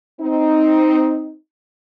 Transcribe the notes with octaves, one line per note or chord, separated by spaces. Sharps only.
C4 D#4